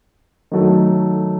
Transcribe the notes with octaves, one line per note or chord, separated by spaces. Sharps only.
D#3 F#3 A3